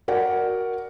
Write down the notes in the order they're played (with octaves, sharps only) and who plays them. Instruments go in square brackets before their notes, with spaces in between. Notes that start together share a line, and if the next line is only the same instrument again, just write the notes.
[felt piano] F#4 A#4 D5 F#5